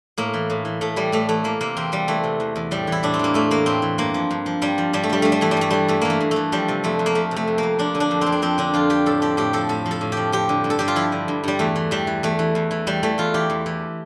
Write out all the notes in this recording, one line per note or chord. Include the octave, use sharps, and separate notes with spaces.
A2 A#3
E3
A2
E3
A2 A3
E3 G3
A2 A3
E3 A3
E3 A#3
C3 A#3
E2 C4
E2 G3
E3 A3
C3
E2
E2
A2 G3
E3 E4
A2 D4
C4
E3 A#3
A2 A3
E3 A#3
A2 C4
E3
G2 A#3
F3
G2
F3
G2 G3
F3
G2 G3
A3
F3 G3
G2 A3
G3
E3 A3
G3
G2 A3
E3 G3
G2 A3
E3 A#3
A3
G2
A3
E3
F3 G3
C3
F2 A3
F2
A#3
F3 A3
C3
A3
F2
A#3
F2
F3 D4
D3
D4
F2
C4
F2
D4
F3 C4
D3 D4
F2 F4
F2 G4
A2 A4
F3 G4
A2 G4
F3 A4
A2 A4
F3
A4
A2
F3 G4
F3 G4
D3
G2
A4
G2 G4
F4
F3 E4
D3
G2
G2 G3
E2 A3
E3
E2 G3
E3
E2 A3
E3
E2
E3
E2 G3
E3 A3
E2 F4
E3 G4
E2
E3